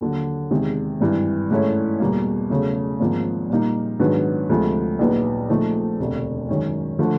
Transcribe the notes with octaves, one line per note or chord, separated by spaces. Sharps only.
D#2 D3 F#3
E2 C3 D#3 G#3
G#1 G2 E3
G#2 E3 A3 C#4 E4
E2 B2 G3 A#3
E2 C#3 F#3 A3
G#1 G#2 F3 A#3
A#2 G3 A#3 D#4
G#2 D#3 F#3 B3 D4
D2 C3 F3 G#3
A#1 A#2 F#3 B3 D#4
A#2 F3 A3 C4 D#4
E1 D2 C3
F#2 D#3 G#3 C#4
D3 F3 A3